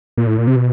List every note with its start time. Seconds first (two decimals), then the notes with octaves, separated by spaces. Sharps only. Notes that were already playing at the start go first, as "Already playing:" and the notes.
0.17 A#2
0.27 A2
0.38 A#2
0.47 C3
0.56 B2